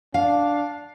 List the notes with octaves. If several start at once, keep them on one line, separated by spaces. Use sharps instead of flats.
D4 F5